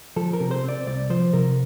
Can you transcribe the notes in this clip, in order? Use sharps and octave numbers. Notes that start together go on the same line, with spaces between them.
F3 A4
A#4
C3
C5
C4 D5
C2 D5
F3 C5
C3 A#4